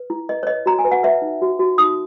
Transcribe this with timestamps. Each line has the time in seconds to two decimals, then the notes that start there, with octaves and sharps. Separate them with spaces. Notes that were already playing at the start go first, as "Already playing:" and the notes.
Already playing: B4
0.10 E4
0.29 B4 D#5
0.43 C#5
0.47 B4 D#5
0.66 F#4 A#5
0.79 G#5
0.85 B4
0.91 F#5
1.03 B4 E5
1.22 D#4
1.42 F#4
1.59 F#4
1.78 D#4 D#6